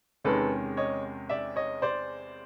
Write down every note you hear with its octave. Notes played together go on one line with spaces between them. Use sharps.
E2 C3 D#3 G#3 C#4 A4 B4
C#5 D#5
D5 E5
C#5 D#5
C5 D5